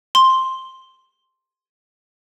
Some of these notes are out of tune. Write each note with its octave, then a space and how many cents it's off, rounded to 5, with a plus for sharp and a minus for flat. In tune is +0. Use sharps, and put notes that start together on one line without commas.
C6 +5